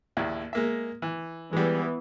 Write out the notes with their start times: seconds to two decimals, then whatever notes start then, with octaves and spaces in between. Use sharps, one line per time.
0.17 A#1 D#2 E4
0.53 G#3 A#3 E5
1.02 E3
1.53 E3 G3 G#3 B3